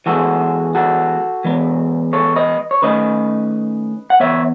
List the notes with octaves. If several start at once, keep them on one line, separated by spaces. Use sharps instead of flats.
E3 G#3 B3 F#4 A4
F#4 A4
E3 G#3 B3
A4 C#5
B4 D#5
C#5
D#3 A3 C#4 B4 D#5
F#5
E3 B3 C#5 E5